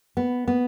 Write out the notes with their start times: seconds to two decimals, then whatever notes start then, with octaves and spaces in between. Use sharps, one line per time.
0.17 B3
0.48 B3